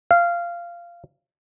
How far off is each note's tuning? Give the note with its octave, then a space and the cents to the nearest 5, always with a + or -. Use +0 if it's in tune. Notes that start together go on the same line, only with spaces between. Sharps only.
F5 -15